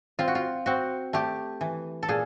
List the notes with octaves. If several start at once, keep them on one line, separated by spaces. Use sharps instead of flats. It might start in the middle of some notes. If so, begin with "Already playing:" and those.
C4 F4
F#4
F4
C4 F#4
A3 G4
E3
A4
A#2 G#4